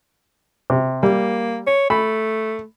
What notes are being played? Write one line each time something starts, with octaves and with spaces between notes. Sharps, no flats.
C3
G3 A#3
C#5
A3 B5